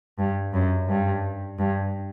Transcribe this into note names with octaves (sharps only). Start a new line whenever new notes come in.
G2
F#2
G2
G2